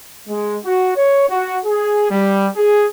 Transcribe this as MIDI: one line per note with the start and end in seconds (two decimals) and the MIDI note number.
0.29 0.58 56
0.65 0.93 66
0.96 1.28 73
1.30 1.59 66
1.65 2.09 68
2.10 2.48 55
2.57 2.87 68